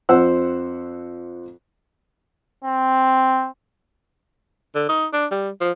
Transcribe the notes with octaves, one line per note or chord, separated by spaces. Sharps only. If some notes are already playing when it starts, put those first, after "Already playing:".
F2 C5 F#5 E6
C4
D3
D#4
D4
G3
F3